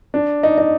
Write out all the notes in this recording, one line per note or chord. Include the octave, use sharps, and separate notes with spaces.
D4
D#4
D#4